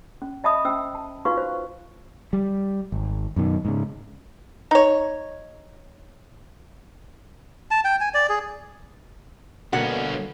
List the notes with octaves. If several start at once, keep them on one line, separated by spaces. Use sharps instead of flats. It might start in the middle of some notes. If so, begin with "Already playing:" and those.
C#4
D#5 E5 A5 B5 D#6
C#4 C5 G5 E6
A5
D#4 F4 F#4 B4 F5 C#6
C5
G3
G#1
F#2 B2 D#3
G#2 C#3
D#4 C#5
A5
G5
G#5
D5
G#4
G2 B2 D3 A#3 C#4 F#5